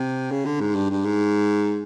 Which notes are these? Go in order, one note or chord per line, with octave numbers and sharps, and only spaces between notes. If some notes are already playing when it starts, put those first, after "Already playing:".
Already playing: C3
C#3
D3
G#2
G2
G2
G#2